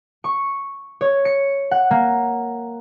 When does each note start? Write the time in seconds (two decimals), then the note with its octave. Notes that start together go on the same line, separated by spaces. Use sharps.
0.24 C#6
1.01 C#5
1.25 C#7
1.71 F#5
1.91 A#3